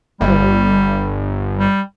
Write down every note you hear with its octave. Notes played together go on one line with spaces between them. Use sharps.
G1 G3
G3